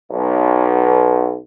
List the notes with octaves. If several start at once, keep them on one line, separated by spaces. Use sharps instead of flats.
B1